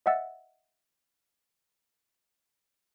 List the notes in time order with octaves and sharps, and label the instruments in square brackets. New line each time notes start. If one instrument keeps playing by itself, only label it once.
[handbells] D#5 E5 F#5 E6 A6